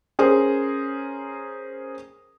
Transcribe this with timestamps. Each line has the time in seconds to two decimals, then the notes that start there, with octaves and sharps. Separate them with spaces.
0.19 C#4 G#4 A#4 C5